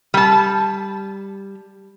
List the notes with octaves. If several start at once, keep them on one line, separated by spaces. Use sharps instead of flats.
G3 A5